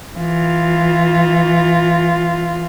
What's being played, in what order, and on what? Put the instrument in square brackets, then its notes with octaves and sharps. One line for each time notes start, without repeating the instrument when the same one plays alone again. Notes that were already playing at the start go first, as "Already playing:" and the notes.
[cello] E3 F4